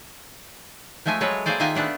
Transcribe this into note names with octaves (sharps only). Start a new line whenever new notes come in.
F3 G#3 A3 E5 G#5
F#3 G#3 A4 B4 C#5
A#3 G#4 A4 C5 D5
D#3 A#3 F4 E5 F#5 G#5
A3 B3 D4 F#5